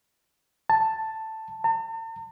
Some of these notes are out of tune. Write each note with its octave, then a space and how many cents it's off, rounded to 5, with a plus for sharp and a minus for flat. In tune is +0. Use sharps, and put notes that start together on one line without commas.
A5 +5
A5 +45